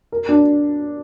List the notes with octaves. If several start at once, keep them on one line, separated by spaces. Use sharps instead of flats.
A#4
D4